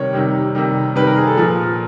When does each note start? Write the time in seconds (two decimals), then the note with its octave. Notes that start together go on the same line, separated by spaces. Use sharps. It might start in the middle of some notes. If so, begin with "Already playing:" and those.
Already playing: C3 D#3 G3 C#5
0.13 C3 D#3 G3
0.55 C3 D#3 G3
0.95 C3 D#3 G3 B4
1.06 A#4
1.17 G#4
1.27 A4
1.37 A#2 F3